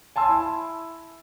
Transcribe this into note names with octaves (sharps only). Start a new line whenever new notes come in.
G#5 A5 C6 E6
E4